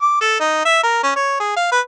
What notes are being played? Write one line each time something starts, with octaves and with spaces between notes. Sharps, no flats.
D6
A4
D#4
E5
A#4
C#4
C#5
G#4
F5
B4